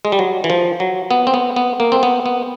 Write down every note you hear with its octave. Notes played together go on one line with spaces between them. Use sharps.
G#3
G3
F#3
E3
F3
F#3
B3
C4
B3
B3
A#3
C4
B3
B3